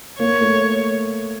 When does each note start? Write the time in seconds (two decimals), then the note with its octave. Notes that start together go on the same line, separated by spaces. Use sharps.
0.19 A#3 C#5
0.41 A3